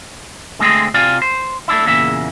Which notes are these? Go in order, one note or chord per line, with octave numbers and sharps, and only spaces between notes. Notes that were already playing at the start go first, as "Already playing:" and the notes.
D3 G#3 A3 C4 G#4
C3 F4 D5 F5 G#5
C5
A3 D4 E4
E2 A#2 C#3 A#3 E5